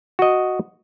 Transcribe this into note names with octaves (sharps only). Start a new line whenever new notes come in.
F#4 D#5